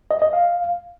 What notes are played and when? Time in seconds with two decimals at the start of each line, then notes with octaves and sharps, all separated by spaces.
0.11 D#5
0.22 D#5
0.33 F5